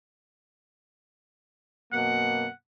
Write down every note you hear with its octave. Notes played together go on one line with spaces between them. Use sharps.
F#2 B2 A#3 F#5